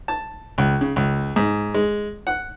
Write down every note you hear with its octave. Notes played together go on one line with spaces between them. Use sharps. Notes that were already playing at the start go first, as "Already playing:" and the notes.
A5
C#2
C#3
C#2
G#2
G#3
F#5